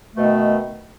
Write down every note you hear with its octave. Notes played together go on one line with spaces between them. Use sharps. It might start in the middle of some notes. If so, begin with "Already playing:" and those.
B2 D#3 A3